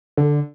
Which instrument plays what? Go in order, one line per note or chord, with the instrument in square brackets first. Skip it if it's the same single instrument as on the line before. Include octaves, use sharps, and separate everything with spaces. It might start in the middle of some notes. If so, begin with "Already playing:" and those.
[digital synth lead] D3